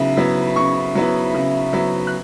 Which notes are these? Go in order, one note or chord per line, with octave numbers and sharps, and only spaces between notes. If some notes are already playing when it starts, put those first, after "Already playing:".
Already playing: C#3 F#3 B3 E4
F#3 B3 E4
C#3 C#6
F#3 B3 E4
C#3
F#3 B3 E4
F#6